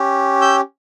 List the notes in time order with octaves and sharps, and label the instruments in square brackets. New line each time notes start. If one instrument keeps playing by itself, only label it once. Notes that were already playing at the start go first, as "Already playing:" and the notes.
Already playing: [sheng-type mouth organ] C#4 G4
E6 G6